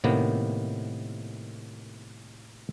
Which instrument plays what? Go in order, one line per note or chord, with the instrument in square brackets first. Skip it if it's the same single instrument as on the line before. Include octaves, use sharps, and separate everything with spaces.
[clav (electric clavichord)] A2 C3 D#3 A#3 B3